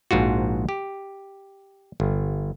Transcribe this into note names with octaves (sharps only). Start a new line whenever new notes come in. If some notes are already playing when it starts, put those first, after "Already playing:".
A#1 G#2 F4 F#4
G4
G1